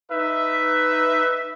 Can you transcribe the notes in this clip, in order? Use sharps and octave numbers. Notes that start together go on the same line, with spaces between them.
D#4 B4 E5